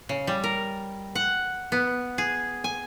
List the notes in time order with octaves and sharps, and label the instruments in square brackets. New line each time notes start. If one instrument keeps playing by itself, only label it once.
[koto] C#3
G3
A#4
F#5
B3
G#4
G#5